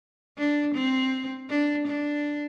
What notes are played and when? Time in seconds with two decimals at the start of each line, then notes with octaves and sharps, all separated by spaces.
0.38 D4
0.75 C4
1.49 D4
1.87 D4